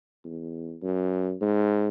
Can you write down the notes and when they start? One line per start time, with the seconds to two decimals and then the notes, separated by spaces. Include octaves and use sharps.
0.25 E2
0.82 F#2
1.41 G#2